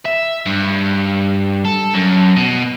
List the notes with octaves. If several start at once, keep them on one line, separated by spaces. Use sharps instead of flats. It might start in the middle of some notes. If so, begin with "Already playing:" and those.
E5
G2
A4
F#2
B2